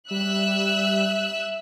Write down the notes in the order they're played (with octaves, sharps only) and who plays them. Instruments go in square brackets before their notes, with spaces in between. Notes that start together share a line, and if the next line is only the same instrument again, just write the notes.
[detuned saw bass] G3 [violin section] E5 E6 F#6